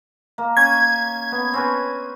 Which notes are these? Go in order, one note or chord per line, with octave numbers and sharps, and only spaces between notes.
A#3
C#4 G#6
B3
C4 C#4 B4